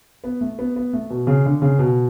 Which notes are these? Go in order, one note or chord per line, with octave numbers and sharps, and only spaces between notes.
B3
A3
B3
B3
A3
B2
C#3
D3
C#3
B2